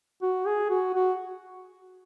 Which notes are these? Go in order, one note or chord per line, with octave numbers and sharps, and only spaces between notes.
F#4
G#4
F#4
F#4